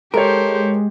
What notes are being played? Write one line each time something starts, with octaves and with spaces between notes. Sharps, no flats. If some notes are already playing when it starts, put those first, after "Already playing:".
G#3 G4 A4 A#4 C5 C#5